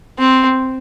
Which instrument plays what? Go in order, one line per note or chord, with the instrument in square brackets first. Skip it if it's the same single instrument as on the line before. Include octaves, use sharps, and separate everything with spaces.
[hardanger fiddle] C4